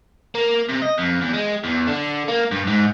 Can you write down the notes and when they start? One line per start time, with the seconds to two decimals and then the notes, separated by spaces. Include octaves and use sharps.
0.35 A#3
0.69 C3
0.82 D#5
0.98 F2
1.21 E2
1.33 G#3
1.64 E2
1.87 D3
2.28 A#3
2.51 G2
2.67 G#2